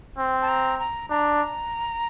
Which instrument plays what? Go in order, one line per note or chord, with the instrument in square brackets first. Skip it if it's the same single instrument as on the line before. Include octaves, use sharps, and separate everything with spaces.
[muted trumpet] C4
[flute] A5
A#5
A#5
[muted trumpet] D4 [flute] A#5